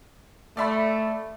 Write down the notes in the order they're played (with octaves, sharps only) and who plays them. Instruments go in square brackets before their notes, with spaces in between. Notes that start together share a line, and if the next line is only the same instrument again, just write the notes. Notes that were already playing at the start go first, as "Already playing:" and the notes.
[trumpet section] A3 [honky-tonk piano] D5 E5 B5